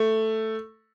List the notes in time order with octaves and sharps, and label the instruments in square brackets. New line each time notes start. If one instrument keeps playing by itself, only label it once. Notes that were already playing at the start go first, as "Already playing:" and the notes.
Already playing: [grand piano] A3